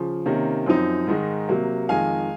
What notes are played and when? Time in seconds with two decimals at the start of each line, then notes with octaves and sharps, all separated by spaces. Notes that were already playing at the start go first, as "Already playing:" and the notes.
Already playing: C#3 F3
0.26 C3 D#3 A#3 C#4
0.66 F#2 F3 C4 D#4
1.07 G#2 D#3 G#3 D#4
1.49 C3 F#3 A#3
1.89 F2 D#3 G#3 F5 G#5